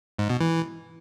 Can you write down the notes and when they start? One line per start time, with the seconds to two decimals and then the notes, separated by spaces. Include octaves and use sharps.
0.19 G#2
0.30 B2
0.41 E3